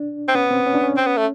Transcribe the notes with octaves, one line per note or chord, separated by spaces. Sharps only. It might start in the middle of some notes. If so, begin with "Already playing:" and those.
Already playing: D4
C4
B3 C#4
C4
C#4
D4
C#4
C4
B3
A3